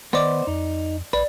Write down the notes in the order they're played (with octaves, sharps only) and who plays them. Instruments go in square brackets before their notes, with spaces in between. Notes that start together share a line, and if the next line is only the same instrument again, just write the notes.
[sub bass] D#3 [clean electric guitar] B3 C5 [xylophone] D5 D#5 D6
[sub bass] F2 [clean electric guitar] D#4
[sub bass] A#1 [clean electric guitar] B4 [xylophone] D5